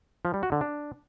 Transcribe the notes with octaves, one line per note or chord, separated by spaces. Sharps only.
F3
G3
F#4
D3
D4